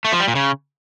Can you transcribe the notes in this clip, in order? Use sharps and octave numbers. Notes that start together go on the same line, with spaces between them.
A3
F3
G3
A#2
C#3